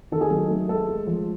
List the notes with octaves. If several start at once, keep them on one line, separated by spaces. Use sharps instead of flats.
D#3 A4
G#4
F#3 A4
A3
G#3 A4
G#3
F3